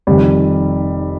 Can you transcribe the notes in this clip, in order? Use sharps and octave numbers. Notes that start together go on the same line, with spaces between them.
F1 F2 D#3 G3